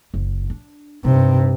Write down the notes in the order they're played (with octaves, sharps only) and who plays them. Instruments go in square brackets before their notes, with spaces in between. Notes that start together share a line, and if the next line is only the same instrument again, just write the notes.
[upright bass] F#1
D4
[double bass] G2 C3 [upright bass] D#4